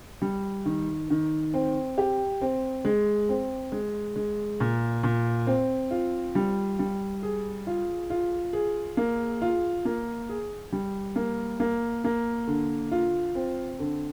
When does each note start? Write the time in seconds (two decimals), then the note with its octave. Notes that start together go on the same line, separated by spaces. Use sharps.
0.22 G3
0.66 D#3
1.10 D#3
1.54 C4
1.98 G4
2.41 C4
2.85 G#3
3.29 C4
3.72 G#3
4.16 G#3
4.60 A#2
5.03 A#2
5.47 C4
5.91 F4
6.35 G3
6.79 G3
7.23 G#4
7.67 F4
8.10 F4
8.53 G#4
8.97 A#3
9.42 F4
9.85 A#3
10.29 G#4
10.72 G3
11.16 A#3
11.60 A#3
12.04 A#3
12.47 D3
12.91 F4
13.35 C4
13.80 D3